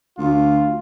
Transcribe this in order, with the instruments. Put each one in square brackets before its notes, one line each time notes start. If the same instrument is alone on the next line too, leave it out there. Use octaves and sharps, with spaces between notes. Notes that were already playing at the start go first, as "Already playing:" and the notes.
[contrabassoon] D2 [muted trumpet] F4